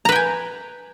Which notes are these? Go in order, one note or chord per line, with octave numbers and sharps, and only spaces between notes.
B4 G5 G#5 A#5